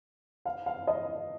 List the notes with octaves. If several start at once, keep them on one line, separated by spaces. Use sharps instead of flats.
F5
F5
D#5